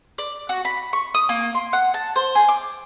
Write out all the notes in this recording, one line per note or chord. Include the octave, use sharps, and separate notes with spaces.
D5
F#4
B5
C#6
D#6
A#3
C6
F#5
A5
C5
G#4
D6